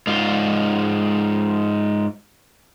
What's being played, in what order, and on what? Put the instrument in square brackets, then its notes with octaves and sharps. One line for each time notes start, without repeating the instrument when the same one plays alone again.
[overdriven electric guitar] G#2 F4